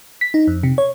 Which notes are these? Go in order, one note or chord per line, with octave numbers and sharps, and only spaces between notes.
B6
D#4
F2
C3
C#5